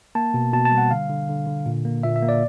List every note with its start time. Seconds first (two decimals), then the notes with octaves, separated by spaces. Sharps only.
0.15 A#3 A5
0.34 B2
0.53 B2 A5
0.65 A5
0.72 G3
0.78 F#5
0.91 D3 F5
1.09 D3
1.29 D3
1.47 D3
1.66 A#2
1.85 A#3
2.03 A#2 E5
2.16 E5
2.22 A#3
2.29 D5